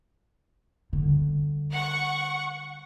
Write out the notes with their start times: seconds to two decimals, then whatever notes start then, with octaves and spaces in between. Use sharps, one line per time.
0.93 D3 G3
1.73 F#5 C#6